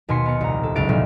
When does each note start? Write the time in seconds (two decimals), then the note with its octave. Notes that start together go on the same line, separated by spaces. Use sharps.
0.09 D#2 B2 G#5 C6 B6 C#7
0.25 B3 A#4 C#7
0.41 C2 A#2 A#5
0.64 A4
0.76 F#1 C#2 F5 A6 D7
0.89 F1 D2 A#2 F#3